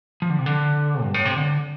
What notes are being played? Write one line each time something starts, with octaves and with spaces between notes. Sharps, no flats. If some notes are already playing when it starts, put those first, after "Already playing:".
F3
D3
C3
D3
G2
A2
C3
D3